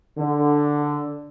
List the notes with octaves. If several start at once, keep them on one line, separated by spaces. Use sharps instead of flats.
D3